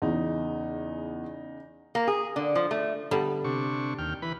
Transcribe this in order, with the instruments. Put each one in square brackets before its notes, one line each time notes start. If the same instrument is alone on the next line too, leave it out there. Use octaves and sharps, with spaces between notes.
[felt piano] E2 [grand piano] C#3 D#4
[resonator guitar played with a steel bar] A#3
G#4
D3
F3
A3
[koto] D3 G3 B3
[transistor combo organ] C3 D4 C#6
D#2 G5 F6
E3 B4 B5